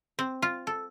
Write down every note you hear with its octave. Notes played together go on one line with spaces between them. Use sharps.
C4
F4
A4